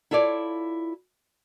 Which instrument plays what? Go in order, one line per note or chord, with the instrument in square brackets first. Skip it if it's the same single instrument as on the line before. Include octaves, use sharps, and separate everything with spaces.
[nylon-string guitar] E4 F4 A4 C#5 D5